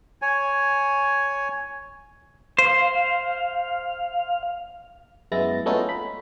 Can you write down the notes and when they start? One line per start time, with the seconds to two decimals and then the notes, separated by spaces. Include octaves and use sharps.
0.22 C#5 G#5
2.59 C5 F5
5.32 F#2 G#3 B3 E4 A6 A#6
5.66 A3 B3 C#4 D#4 F4 A4
5.89 B5